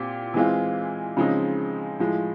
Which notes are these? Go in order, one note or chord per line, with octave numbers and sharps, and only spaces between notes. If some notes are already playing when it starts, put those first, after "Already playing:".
Already playing: A#2 C4 G4
E3 G#3 C4 F4
C#3 F3 G#3 C4 D#4
A2 F3 G#3